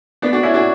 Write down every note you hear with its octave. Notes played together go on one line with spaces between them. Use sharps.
B3 D4
D4 F#4
C#4 E4
D4 F#4